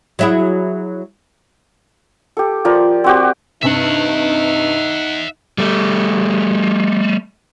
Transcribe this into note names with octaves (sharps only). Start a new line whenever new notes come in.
F#3 E4 G#4
G4 A4
F3 A#4 D5
C4 F#4 G4
G2 C3 D#4 E5 F#5
G3 A3